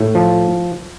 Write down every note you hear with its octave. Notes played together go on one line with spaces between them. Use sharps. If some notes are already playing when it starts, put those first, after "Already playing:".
Already playing: A2
F3